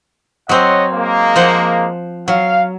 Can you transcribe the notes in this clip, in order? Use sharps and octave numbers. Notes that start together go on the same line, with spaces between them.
F#3 C4 C#5 D#5 F#5
G#3 A#3
F3 C5 F#5
F#3 F5